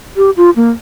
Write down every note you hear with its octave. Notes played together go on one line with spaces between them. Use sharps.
G4
F4
A#3